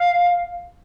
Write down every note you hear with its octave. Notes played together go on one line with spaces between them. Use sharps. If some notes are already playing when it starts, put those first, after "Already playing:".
Already playing: F5